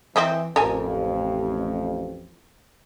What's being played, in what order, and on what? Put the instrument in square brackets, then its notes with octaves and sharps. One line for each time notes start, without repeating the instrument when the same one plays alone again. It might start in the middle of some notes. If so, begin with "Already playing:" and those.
[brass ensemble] E3 [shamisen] C4 D#5 E5
[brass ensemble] A1 F2 [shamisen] A4 A#4 G#5